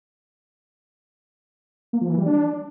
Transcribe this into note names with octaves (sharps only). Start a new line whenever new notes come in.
A#3
F3
E3
G3
D4